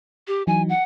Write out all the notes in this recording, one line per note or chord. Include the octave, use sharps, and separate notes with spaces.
G4
E3 F#3 D#4 G#5
F#5